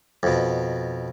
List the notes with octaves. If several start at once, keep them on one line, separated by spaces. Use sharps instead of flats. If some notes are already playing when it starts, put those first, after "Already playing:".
F2 B2